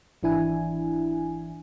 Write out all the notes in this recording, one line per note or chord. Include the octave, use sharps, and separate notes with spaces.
G#1 E3 D4 E4 G#5